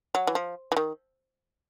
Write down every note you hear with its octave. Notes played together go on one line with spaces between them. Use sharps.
F#3
E3
F3
E3
D#3